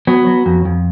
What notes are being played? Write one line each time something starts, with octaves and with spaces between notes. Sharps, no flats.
F#3 B3
F#3
F2
F2